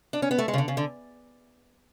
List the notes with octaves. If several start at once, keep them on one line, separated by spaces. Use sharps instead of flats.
D4
C#4
B3
A3
G#3
C#3
D3
C#3
D3